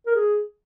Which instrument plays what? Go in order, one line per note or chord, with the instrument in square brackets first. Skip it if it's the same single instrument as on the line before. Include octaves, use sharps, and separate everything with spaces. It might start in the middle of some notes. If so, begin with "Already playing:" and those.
[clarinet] A#4
G#4